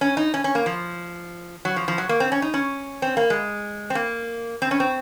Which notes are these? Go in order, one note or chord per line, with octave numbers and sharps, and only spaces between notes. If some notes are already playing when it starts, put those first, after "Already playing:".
C#4
D#4
C#4
C#4
A#3
F3
F#3
F3
F3
F#3
A#3
C4
C#4
D#4
C#4
C4
A#3
G#3
C4
A#3
C4
C#4
C4